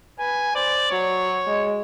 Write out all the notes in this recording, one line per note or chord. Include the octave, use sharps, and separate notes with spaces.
B4 G#5
C5 D5
F#3 C#5
G#3